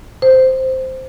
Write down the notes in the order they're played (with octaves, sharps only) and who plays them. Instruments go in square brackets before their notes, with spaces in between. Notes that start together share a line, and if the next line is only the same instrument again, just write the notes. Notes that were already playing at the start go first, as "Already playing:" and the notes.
[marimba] C5